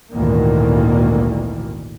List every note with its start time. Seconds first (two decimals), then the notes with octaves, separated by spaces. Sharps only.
0.13 G#1 D2 A#2 D#3 E3 A#3